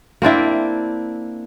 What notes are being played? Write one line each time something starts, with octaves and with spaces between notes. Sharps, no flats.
A#3 C4 D4 E4